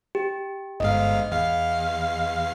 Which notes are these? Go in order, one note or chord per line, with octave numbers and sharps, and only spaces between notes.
G4
G1 G#2 D#5 F5
E2 F5